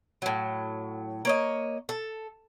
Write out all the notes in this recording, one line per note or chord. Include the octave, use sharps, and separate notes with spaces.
A2 F#3
A#3 C#5 D#5
A4